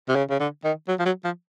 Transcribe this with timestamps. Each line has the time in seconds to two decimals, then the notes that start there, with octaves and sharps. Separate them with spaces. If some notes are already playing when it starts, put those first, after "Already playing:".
0.09 C3
0.15 C#3
0.30 C#3
0.40 D3
0.64 D#3
0.88 F#3
0.99 F3
1.06 F#3
1.24 F3